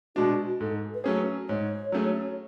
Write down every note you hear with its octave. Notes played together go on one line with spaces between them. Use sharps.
B2 G#3 D4 F#4
G#2 A4
B4
F#3 A3 C#4 G#4 C#5
G#2 C#5
F#3 A3 C#4 G#4